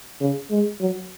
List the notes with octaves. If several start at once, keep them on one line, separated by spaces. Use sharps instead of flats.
C#3
G#3
F#3